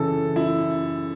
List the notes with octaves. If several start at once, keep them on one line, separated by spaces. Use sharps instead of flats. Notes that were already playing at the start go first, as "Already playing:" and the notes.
Already playing: F#2 C#3 E3 A4
F#2 E4